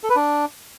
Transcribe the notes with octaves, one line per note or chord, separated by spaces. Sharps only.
A4
B4
D4